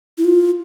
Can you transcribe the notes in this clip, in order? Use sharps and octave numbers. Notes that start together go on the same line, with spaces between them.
E4
F4